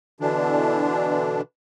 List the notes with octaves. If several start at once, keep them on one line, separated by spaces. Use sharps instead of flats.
B2 D3 E3 D4